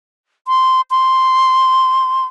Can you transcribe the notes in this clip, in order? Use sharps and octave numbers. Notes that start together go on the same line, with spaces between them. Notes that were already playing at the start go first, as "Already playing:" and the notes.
C6
C6